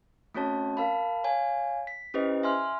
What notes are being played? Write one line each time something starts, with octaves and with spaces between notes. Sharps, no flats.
A3 C4 C#4 F#4 C#5 A5
A#4 F5 A5 B5
C#5 F5 G#5
B6
C#4 E4 G4 B4 C5 D#5
E5 G#5 C6 F6